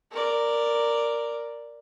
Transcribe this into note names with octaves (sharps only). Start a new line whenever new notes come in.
A#4 D5